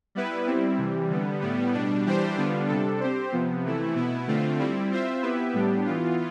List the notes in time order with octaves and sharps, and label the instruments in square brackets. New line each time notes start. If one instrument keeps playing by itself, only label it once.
[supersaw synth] G3 B3 E4 B4
G3 C4 E4
C3 E3 G3
D3 G3 B3
A2 G3 B3
B2 G3 D4
E3 G3 D4 G4 C5
D3 G3 B3 D4 F4
C3 G3 D4 A4
C4 G4 C5
C3 F3 B3
C3 E3 A3 E4
B2 B3 E4
D3 A3 C4 F4
G3 C4 E4
C4 F4 C5 E5
B3 E4 G4 B4 E5
A2 G3 B3 D4 G4
E3 B3 F4